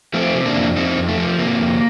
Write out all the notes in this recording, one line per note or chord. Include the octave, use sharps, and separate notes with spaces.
F3 A3 C4
C3
A#3 D4
F2
F2 C4 D#4
F2
A3
F3
C3 A#3
F2